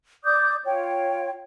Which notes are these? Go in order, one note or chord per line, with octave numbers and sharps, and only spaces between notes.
D5 D6 D#6 G6
F4 C#5 G5